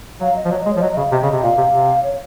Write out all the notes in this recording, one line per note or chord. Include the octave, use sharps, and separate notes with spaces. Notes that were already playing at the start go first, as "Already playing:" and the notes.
F#3 F5
D#5
F3
F#3 C#5
G#3 D#5
F3 C#5
F#3 D#5
D#5
C#3 F5
C3 D#5
C#3
C3
A#2 F5
C3
C3
C#5